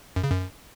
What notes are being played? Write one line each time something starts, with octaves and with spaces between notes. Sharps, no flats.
F#2
C#3
F#2